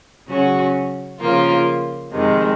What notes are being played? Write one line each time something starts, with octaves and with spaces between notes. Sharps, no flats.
C#3 F#3 C#4 F#4
C#3 F3 A#3 F4
F2 C3 D#3 G#3